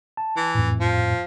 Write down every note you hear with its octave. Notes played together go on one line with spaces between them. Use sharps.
A5
E3
F2 A2
F3